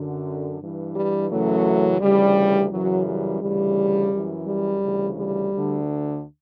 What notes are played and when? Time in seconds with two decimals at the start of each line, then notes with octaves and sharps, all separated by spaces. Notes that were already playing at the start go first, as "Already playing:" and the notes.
Already playing: F#2 D3
0.61 G2 E3
0.96 G3
1.31 F#2 C#3 E3 F#3 A3
2.01 D2 C#3 E3 G3
2.71 F#2 C#3 E3 F#3
3.06 G3
3.41 D2 C#3 E3 G3
4.12 F#2 E3
4.47 G3
4.82 D2 C#3 E3
5.17 G3
5.52 D2 D3